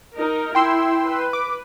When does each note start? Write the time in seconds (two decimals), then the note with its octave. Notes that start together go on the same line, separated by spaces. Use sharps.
0.15 D#4 A#4
0.55 E4 G5 C6 E6
1.04 B4
1.33 D6